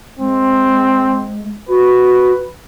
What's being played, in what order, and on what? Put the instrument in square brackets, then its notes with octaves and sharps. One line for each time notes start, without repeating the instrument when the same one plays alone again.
[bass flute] G#3 [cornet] C4
[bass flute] F#4 [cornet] B4